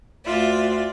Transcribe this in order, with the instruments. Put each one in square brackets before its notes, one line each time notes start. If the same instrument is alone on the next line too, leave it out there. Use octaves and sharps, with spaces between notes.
[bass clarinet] D2 [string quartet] F4 D5 E5